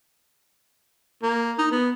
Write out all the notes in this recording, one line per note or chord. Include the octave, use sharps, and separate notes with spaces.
A#3
D#4
B3